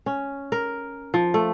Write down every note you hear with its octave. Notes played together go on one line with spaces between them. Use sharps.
C#4
A#4
F3
A3